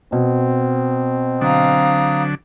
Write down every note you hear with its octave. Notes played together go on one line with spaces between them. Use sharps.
B2 C4
D3 F#3 D4 F5 A#5 D#6